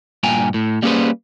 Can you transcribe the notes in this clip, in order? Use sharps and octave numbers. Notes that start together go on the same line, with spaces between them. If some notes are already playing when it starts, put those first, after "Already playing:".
G2 A#2 G5 G#5 A#5
A2
G3 A#3 C#4 G#4 B4 C5